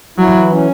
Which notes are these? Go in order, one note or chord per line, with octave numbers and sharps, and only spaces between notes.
F#3 E4
E3
C#4